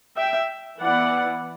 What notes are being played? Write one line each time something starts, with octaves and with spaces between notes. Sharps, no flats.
E5 G5
E3 B3 E4 D5 F#5